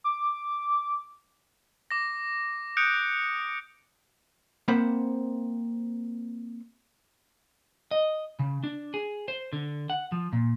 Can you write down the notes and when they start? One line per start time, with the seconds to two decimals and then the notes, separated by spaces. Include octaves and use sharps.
0.04 D6
1.91 D6 A#6
2.77 D#6 F#6 G6 C#7 D7
4.68 A#3 C4 C5 F#5 B5
7.91 D#5
8.39 C#3
8.64 D4
8.94 G#4
9.28 C5
9.53 D3
9.90 F#5
10.12 F3
10.33 A#2